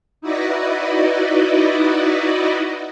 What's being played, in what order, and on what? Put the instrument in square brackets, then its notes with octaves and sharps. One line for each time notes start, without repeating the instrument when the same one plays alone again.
[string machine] D#4 E4 F#4 B4 D5 D#5